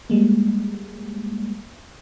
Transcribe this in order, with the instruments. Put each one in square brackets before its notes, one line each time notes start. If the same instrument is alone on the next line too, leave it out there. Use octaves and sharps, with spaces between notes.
[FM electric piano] G3 G#3 A#3